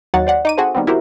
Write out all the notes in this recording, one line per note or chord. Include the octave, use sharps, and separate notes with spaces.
D#2 F#3 D#4 C#5 F#5 A6
C5 D5 F#5
D#4 D6 D#7
C4 F#4 G#4 A4 C5
D#3 G3 B3 C4
E4 F#4 G4 A#4 C5